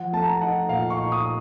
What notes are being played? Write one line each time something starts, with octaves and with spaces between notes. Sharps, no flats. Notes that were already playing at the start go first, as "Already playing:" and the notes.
Already playing: F3 F#5
A3 A5
A#5
A5
D#4 F#5
A#2 F5
C#6
D#4
D#6